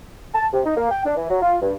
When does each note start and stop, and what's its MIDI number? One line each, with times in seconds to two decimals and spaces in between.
0.34 0.47 81
0.53 0.61 48
0.65 0.75 63
0.77 0.88 58
0.90 1.02 79
1.05 1.13 62
1.17 1.25 52
1.30 1.40 54
1.42 1.58 65
1.62 1.74 43